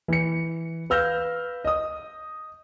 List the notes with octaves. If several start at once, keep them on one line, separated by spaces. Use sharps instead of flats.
E3 C#7
B4 F5 E6 F6 G6 A#6
D#5 D#6